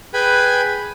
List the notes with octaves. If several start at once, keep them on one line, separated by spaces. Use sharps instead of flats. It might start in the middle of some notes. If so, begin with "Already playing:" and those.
G#4 B4 G5 G#5 B5